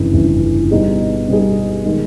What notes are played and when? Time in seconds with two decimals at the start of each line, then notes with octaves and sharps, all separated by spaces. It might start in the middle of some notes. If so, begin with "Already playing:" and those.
Already playing: G1 F2 C#3 E3
0.13 G1 F2 C#3 E3
0.71 B2 G3 B3 D#4 G#4
1.28 B2 G3 B3 D#4 G#4
1.85 D#3 G#3